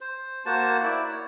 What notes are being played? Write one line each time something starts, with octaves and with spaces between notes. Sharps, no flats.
C5
A#3 F#4 C5 A5
E4 D5
C#5